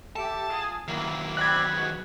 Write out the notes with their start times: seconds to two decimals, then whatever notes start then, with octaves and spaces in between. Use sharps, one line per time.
0.16 G4 A4 E5 A5
0.49 F4 G#4 G#5
0.88 D#3 F#3 A#3 E4
1.37 C4 D5 B5 F#6 G#6
1.71 G#3 B3 F#4